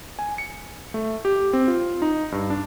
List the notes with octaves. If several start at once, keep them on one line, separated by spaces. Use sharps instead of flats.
G#5
C#7
A3
G4
C4
F4
D#4
G2
D4